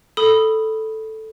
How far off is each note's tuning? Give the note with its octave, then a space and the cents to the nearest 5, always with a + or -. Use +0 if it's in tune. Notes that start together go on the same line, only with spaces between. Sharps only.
A4 +0 B5 +0 D#6 +0